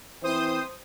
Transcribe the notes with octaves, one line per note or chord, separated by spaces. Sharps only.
E3 C4 E4 C5 D#6